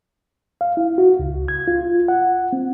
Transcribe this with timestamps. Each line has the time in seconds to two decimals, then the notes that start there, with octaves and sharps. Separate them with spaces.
0.61 F5
0.77 E4
0.98 F#4
1.19 C#2
1.48 G#6
1.68 F4
2.08 F#5
2.53 C4